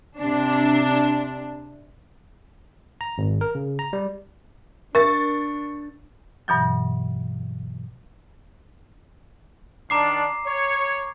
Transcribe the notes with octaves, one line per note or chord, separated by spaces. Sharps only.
C3 D4
A#5
G#1
A#4
C#3
A#5
G3
D4 A#4 C#6 A6
G2 B2 E3 F#3
D#3 D4 A#5 D6 C7
C#5